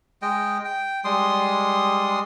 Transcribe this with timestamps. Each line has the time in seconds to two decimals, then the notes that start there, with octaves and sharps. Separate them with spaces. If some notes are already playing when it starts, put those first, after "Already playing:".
0.22 G#3 D#5 G5
0.65 G5
1.05 G3 G#3 C6 D#6